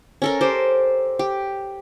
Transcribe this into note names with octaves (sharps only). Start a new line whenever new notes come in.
C#4 A4 A#4
G4 C5
G4